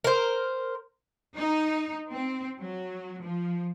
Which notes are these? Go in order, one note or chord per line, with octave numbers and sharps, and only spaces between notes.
A#4 C5
D#4
C4
F#3
F3